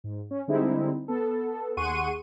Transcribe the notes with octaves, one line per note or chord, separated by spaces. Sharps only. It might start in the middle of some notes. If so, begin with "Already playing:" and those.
G#2
C#4
D3 G3 G#3 C4 D#4 E4
B3 A4
D#2 G#4 F#5 C6 C#6 D#7